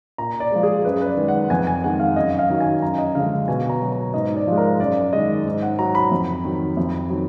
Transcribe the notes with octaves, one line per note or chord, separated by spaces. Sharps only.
A#2 A#5
D5
F3 G#3
G#4
F#2 B4
B4
D5
D#3 G#3
F#5
F2 G#5
G#5
D#3 G#3 F#5
F5
F#2 D#5
D#5
F5
D#3 F#3
G#5
F#2 A#5
D#5
D3 F3 G#3 F5
B2 G#5
A#5
F#3
A#5
G#2 D#5
D5
F3 G#3
A#4
F#2 D5
D#3 G#3 D#5
G#2
F#5
F#3 A#5
B5
F2
D#3 F#3
F2
D#3 F#3